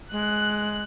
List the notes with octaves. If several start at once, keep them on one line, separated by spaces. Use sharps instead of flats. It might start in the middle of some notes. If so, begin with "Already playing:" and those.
G#3 F#6